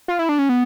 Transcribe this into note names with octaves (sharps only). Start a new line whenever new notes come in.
F4
E4
D4
C#4
B3